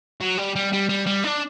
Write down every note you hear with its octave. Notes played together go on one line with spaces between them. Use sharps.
F#3
G3
G3
G3
G3
G3
D4